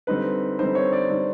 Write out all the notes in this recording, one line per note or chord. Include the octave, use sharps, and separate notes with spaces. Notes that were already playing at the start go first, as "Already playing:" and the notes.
D3 G3 C4 D#4 B4
D3 G3 C4 D#4 C5
C#5
D5
D3 G3 C4 D#4 D5